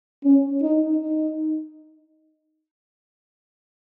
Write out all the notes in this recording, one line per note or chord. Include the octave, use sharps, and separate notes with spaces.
C#4
D#4
D#4